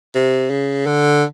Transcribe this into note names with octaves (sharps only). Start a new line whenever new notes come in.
C3
C#3
D3